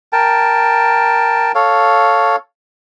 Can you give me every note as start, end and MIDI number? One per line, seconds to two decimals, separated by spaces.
0.13 1.52 70
0.13 1.52 79
0.13 1.52 81
1.55 2.36 69
1.55 2.36 73
1.55 2.36 77